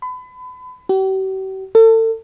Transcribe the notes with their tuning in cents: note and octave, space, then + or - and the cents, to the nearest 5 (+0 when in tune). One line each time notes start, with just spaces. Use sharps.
B5 +35
G4 -45
A4 +35